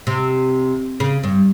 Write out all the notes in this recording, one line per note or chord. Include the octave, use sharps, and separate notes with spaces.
C3
C#3
G2